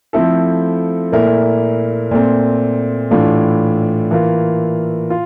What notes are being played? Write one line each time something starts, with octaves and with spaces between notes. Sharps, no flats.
F3 A3 C4 E4 A4
A#2 A3 E4 A#4
A#2 A3 C4
A2 E3 A3 D4 F4
E3 A#3 F4
F4